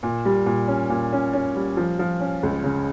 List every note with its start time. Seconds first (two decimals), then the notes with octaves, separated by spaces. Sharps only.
0.03 A#2
0.25 G3
0.46 A#2
0.68 C#4
0.90 A#2
1.13 C#4
1.33 C#4
1.56 G3
1.77 F3
1.99 F3
2.20 C#4
2.43 C#2
2.64 C#3